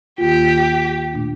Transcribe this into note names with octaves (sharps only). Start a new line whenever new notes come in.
D#2 D#3 A#3 F4 G4
A#2 A3 D4